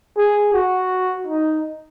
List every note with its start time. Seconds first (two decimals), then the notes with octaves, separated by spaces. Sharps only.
0.17 G#4
0.54 F#4
1.27 D#4